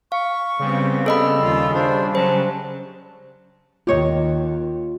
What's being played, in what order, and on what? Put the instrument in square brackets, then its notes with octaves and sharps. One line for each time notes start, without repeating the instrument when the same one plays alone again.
[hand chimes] F5 [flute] C#6
[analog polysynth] C#3 G3 [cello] B3 C4
[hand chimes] A4 D#5 B5 [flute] E6
[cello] D#2 F4
[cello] D4 [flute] C5
[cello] F#3 C#4 [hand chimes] C5 [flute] A5
[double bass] D#2 D#3 [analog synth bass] F4 [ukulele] G4 C#5 D#5